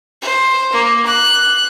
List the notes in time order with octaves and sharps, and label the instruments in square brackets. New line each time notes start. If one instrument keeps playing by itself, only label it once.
[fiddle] C5
A#3
F#6